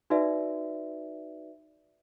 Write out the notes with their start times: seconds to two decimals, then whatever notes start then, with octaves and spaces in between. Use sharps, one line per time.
0.10 D#4 F#4 B4 D5 E5